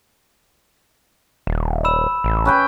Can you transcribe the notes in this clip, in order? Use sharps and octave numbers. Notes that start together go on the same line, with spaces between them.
D#1
B5 E6 E7
A1
C#4 B4 G5